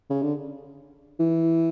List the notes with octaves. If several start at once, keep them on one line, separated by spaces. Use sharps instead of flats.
C#3
D3
E3